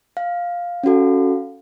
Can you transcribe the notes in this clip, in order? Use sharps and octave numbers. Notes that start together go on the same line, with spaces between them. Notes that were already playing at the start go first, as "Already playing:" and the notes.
F5
C#4 F#4 A4